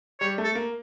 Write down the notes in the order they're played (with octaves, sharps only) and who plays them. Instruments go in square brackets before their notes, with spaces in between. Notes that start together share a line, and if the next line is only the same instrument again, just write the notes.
[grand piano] G3 [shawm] C#5
[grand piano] A3
[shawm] A4
[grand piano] A#3